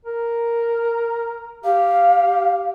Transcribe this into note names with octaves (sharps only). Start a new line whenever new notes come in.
A#4
G4 F5